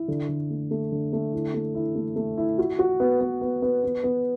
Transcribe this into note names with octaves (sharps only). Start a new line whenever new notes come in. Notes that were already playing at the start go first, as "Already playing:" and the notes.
Already playing: E4
D3
D3
A3
A3
D3
A3
E4
A3
E4
A3
A3
E4
F#4
F#4
B3
B3
B3
B3
B3
B3